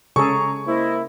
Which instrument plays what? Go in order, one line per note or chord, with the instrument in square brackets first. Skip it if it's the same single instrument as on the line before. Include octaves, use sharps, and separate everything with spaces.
[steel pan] C#3 G#4 A4 [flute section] A#5 [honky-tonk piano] C#6
[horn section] A#3 E4 [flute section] C5 D#5